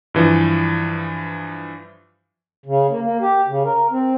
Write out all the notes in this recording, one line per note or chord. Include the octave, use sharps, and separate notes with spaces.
G2 E3 F3
C#3
A#3
A#3
G4
C#3
A#4
C4